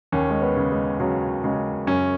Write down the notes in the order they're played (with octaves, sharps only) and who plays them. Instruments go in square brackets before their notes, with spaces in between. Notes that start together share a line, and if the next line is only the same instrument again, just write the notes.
[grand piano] D#2 C#4
G#3
B3
C#3
G#3
C#3 F#3
C#3 G#3
F#2 C#4